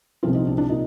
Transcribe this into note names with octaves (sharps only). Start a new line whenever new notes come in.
C2 A#2 F3 C4 F4
D#4
D4
D4
A#2 D#4